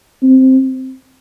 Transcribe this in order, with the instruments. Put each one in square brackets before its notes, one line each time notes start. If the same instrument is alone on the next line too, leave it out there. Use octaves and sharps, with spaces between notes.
[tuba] C4